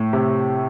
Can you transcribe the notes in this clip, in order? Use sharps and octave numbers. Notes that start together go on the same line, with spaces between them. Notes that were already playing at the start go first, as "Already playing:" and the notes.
Already playing: A2
C3